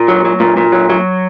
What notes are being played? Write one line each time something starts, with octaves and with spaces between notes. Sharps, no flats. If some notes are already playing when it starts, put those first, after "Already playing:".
Already playing: A#2
F#3
F#3
A#2
A#2
F#3
F#3